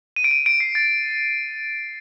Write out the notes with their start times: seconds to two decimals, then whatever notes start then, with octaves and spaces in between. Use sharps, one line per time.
0.16 D#7
0.24 D7
0.31 D#7
0.46 D7
0.60 C7
0.75 A6